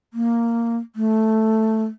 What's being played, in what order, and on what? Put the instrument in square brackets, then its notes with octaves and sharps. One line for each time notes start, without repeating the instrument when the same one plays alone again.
[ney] A#3
A3